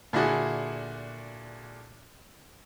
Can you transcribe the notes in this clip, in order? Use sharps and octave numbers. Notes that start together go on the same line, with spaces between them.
A#2 D3 E4 F#4 G#4